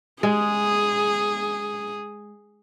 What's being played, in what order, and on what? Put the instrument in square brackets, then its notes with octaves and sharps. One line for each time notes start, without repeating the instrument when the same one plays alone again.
[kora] G#3 [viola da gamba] G#4